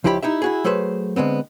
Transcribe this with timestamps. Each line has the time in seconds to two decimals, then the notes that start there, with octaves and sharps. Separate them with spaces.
0.04 C#2 F3 E4 G4 C5 B5
0.22 D#4 E4 G4 E5
0.42 E4 F#4 G#4
0.64 F#3 A3 G#4 B4 C5
1.16 D3 G#3 B3 C4